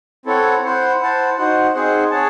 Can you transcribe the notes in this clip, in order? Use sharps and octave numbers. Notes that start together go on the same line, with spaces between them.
C4 E4 A4 C#5 F#5
E4 C5 F#5
E4 C5 F#5 A5
D#4 F#4 C5 F#5
C4 D#4 G#4 C5 F#5
G#4 C#5 F#5 A5